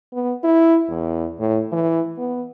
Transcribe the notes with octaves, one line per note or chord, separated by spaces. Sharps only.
B3
E4
E2
A2
E3
B3